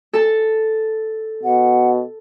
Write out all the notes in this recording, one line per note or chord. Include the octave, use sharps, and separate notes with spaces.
A4 A5
B2 F#5